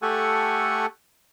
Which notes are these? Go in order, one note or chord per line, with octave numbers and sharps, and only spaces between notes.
A3 G4 A4 F#5 G#5 C#6